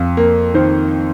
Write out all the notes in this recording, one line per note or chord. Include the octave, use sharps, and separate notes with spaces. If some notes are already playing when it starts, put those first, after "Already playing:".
Already playing: F2 F5
A#3
D#3 C5